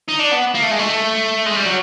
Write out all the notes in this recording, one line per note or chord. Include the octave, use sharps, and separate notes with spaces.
D#4
D4
B3
A#3
A3
G#3
A3
G#3
G3
F#3